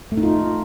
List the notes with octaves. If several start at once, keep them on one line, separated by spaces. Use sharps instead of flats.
A3
D#4
F4